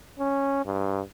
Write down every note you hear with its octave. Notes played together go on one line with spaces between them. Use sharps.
C#4
G2